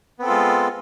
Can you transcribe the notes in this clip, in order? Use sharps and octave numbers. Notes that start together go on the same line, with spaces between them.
G#3 B3 C4 F4 A4